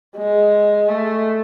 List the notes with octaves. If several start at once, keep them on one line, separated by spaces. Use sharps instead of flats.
G#3
A3